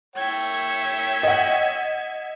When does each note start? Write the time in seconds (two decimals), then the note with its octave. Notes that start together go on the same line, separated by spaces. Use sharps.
0.16 C#5 E5 G5 G#6
1.23 D#5 F#5